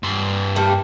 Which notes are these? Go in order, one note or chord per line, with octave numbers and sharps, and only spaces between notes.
G2 C6
G3 A3 A#3